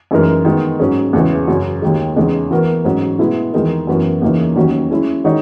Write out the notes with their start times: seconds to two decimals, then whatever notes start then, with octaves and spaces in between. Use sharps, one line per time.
0.11 F#2 E3 G#3 D#4 A#4
0.45 D#3 G#3 B3 D#4
0.80 G#2 F#3 C#4 G#4
1.13 E2 C#3 E3 G#3
1.47 F#2 C#3 F#3
1.82 D#2 D#3 G#3
2.16 E2 C#3 G#3 D#4
2.51 E3 B3 F#4 A#4
2.85 G#2 F#3 C#4 F#4
3.19 B2 G#3 B3 E4
3.53 E2 D#3 G#3 D#4 A#4
3.87 F#2 E3 B3 F#4 A#4
4.22 E2 C#3 E3 A#3 D#4
4.56 D#2 D#3 F#3 C#4 F#4
4.91 G#3 C#4 E4
5.24 D#3 G#3 D#4 F#4 C#5